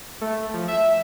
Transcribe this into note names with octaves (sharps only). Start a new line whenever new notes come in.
A3
F3
E5